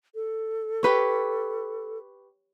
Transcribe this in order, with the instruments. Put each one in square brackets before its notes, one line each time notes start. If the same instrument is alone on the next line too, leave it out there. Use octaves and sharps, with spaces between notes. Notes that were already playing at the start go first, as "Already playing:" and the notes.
[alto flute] A4
[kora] G4 B4 C#5